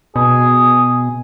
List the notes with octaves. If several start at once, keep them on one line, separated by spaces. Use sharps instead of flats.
B2 G#4